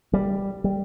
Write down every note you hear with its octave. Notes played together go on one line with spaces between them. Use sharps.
G3
G3